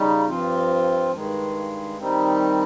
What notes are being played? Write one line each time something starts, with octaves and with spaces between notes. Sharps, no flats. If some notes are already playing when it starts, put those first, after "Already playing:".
Already playing: C#3 G3 D#4
G2 F3 C4 F4
G2 D#3 G#3
D#3 G3 C4 D#4